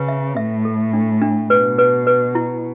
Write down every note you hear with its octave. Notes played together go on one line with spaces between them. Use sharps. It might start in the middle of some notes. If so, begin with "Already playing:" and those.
Already playing: C#3 B4
E5
A2 E5
A4
D4
D4
B2 B4
B4
B4
E4